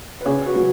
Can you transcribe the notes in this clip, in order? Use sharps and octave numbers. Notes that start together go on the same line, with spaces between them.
B4
C#3 G#4 C#5
F#4 B4
F#3